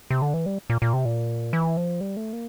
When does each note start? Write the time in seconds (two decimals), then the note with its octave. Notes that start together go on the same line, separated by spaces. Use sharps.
0.11 C3
0.22 D3
0.34 E3
0.46 G3
0.70 A#2
0.82 A#2
0.93 C3
1.05 A#2
1.53 E3
1.77 F3
2.01 G3
2.17 A3
2.33 A#3